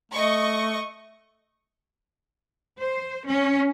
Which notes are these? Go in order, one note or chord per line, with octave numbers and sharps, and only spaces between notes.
A3 D#5 C#6
C5
C#4